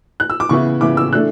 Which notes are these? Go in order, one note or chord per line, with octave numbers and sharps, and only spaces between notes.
F#6
E6
D6
C#3 E3 B3 E4 C#6
C#3 E3 B3 E4 D6
E6
E3 A3 D4 F#6